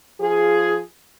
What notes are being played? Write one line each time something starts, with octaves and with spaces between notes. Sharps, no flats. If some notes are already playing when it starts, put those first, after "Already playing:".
F3 F4 G#4